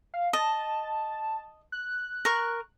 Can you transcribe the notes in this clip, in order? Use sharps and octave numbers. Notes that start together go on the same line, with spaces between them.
F5
D#5 A5
F#6
A#4 C#6